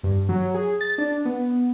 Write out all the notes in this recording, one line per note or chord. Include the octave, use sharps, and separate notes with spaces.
G2
F#3
G#4
A6
D4
B3